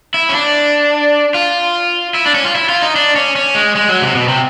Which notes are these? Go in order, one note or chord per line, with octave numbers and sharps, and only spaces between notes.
E4
C#4
D4
F4
E4
D4
C#4
F4
E4
F4
D#4
D4
C#4
C#4
G#3
G#3
F#3
C3
B2
C3